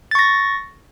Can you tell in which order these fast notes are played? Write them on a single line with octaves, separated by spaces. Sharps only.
A6 C#6 A#6